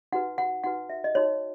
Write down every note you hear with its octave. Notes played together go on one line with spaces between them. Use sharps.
D#4 F#4 B4 F#5
F#5
D#4 F#4 B4 F#5
E5
D#5
D#4 F#4 C#5